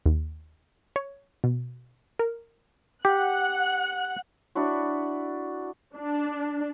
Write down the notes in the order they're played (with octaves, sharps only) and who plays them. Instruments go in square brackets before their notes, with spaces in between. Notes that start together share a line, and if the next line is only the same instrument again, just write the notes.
[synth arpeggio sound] D#2
C#5
B2
A#4
[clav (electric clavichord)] G4 [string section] F#5 F#6
[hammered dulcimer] D4 E4 F#4
[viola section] D4